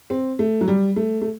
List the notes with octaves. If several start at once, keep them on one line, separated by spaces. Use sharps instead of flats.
C4
A3
F#3
G3
A3
A3